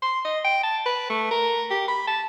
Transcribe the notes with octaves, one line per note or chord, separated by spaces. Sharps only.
C6
D#5
G5
A5
B4
A3
A#4
G4
B5
A5